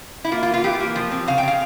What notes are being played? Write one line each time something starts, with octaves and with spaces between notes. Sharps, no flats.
E4
A#3 F4
F4
E3
F4
E3 G4
A#3
F3
C4
C#3 F5
G5
C#3 F5